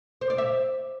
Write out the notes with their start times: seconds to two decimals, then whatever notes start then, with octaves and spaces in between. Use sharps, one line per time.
0.21 C5
0.30 D5
0.38 E5